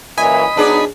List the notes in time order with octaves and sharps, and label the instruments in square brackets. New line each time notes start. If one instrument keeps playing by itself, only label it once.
[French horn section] F#2 A#2 E3 [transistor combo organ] D#5 B5 [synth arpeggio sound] G#5
[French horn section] F#3 B3 D#4 [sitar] D4 G#4 D5